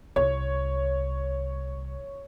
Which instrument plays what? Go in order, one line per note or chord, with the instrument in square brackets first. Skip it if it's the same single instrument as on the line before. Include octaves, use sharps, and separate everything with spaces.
[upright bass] C2 [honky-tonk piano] C#5